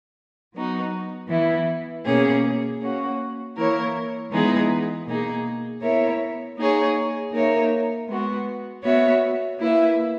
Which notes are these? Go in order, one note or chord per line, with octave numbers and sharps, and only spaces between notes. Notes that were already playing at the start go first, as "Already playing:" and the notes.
F#3 B3 D#4 F#4
E3 B3 E4
B2 A#3 C#4 G#4
A#3 C#4 F#4
E3 A#3 E4 A#4 C#5
E3 G#3 B3 D#4 G#4
B2 A#3 D#4 G#4
B3 E4 A#4 C#5 E5
A#3 D#4 G#4 C#5
A#3 D#4 A#4 C#5 E5
G#3 B3 F#4
B3 F#4 C#5 E5
A#3 E4 B4 E5